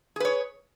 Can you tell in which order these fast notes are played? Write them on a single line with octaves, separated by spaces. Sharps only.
G#4 B4 C#5